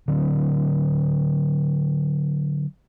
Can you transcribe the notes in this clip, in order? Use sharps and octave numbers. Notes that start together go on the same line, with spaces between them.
D3 F#3 C4